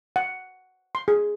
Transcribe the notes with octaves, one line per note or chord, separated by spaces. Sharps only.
F#5
C6
G#4